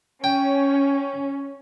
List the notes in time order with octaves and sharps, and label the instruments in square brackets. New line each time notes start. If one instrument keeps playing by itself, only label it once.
[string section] C#4 [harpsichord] G5